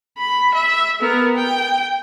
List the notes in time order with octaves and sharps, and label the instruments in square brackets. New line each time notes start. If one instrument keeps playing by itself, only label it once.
[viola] B5
E5
B3 A#4
G5